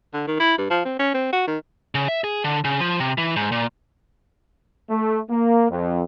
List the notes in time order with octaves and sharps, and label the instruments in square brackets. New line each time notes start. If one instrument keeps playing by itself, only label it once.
[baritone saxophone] D3
D#3
E4
G2
F3
C4
C#4
C4
F#4
D#3
[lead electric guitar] C#3
E5
G#4
D3
C#3
F3
C3
E3
G#2
A#2
[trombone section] A3
A#3
F2